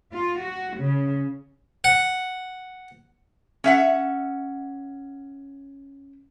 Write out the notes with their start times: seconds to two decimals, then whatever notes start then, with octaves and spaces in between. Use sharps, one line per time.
0.12 F4
0.40 F#4
0.78 C#3
1.84 F#5
3.64 C#4 E5 F#5